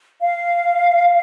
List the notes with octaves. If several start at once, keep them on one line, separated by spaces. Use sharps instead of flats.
F5